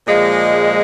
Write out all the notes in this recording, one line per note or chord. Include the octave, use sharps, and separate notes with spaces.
A#2 F3 G#3